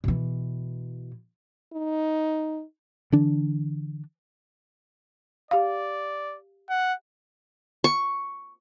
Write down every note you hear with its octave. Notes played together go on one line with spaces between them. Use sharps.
B2 E3
D#4
D3 E3 D4
G4 D5 F5
F#5
C#6